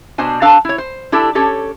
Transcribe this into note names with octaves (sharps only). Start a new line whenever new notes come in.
B2 D4 C5 G#5
D4 A4 C5 F5 A#5
E4 C#5
C5
D4 E4 G4 A4
C#4 G4 A4 C#5